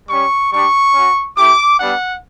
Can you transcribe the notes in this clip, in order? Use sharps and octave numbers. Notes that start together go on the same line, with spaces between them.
G3 C#4 G4 C#6
G3 D4 G4 C#6
C#4 F#4
A3 E4 G4 D6
G3 B3 D4 F#5